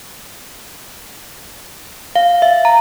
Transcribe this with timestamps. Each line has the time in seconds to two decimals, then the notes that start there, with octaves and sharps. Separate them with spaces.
2.16 F5
2.42 E5
2.65 A#5